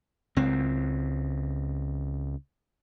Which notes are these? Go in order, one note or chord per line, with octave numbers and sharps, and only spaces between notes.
C#2 C4